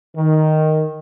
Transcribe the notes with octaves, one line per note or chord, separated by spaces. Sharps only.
D#3